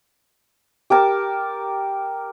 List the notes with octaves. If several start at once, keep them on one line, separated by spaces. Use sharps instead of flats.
G4 A#4 A5